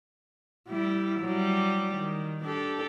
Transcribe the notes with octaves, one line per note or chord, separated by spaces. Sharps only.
G3 E4
F#3 G3
D#3
D4 G4 A4